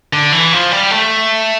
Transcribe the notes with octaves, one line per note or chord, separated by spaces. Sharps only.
D3
E3
F3
G3
A3